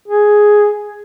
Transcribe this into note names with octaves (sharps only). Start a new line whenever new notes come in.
G#4